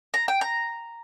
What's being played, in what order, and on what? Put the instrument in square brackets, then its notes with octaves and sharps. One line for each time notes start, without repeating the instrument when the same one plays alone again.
[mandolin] A#5
G5
A#5